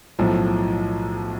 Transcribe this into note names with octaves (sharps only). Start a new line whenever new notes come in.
B1 A2 F3